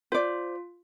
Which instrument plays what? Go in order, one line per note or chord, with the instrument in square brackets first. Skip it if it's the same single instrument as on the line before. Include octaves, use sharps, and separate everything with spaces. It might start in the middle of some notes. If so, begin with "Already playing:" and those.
[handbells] F4 [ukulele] C5 D5